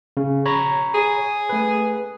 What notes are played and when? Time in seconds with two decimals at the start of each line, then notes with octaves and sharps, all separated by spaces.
0.17 C#3
0.46 C#5 A#5 B5
0.95 G#4
1.49 A3 B4